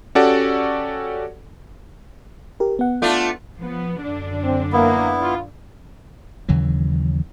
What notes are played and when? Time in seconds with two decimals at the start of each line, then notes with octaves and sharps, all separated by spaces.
0.15 C#4 F#4 G4 A4 D5 F#5
2.60 G4 A#4
2.79 B3 F#5
3.02 A3 D4 F4
3.58 F3 B3
4.02 F#2 D3 D4
4.43 C4
4.72 A#3 B3 E4
5.21 F4
6.49 D#2 C#3 E3 F#3